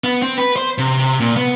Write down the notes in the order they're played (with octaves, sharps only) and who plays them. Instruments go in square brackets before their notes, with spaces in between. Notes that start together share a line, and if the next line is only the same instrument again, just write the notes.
[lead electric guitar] B3
C4
B4
C5
C3
A#2
B3